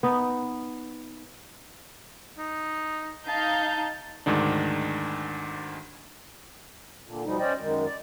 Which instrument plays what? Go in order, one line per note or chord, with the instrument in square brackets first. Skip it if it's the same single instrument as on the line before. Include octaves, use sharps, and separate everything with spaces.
[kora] B3 D#4
[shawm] D#4
[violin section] D#4 F5 G6 [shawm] A5
[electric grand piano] D2 G#2 D#3 D4
[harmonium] A#2 D3
B2 F3 G3 D#4
C#4 C5 D5 D#5 G5
F#2 D#3 G#3
D5